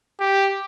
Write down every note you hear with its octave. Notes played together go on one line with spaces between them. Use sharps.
G4